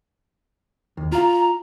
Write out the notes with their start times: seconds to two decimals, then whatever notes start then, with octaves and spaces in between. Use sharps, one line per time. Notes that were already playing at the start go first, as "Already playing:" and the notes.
0.97 D#2
1.12 F4 F5 A#5